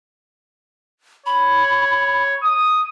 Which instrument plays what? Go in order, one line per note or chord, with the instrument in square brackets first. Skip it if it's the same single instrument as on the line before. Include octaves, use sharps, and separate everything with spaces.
[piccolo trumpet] C#5 [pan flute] B5
[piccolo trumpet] D#6